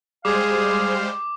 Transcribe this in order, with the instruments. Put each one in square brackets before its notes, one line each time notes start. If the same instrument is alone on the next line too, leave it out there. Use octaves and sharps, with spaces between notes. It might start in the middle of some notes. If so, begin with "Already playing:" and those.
[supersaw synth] G3 G#3 C5 [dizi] G#4 [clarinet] F5 [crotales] D6